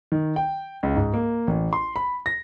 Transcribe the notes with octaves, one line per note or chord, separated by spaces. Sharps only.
D#3
G5
C#2
G#2
A#3
A1
C6
B5
A#6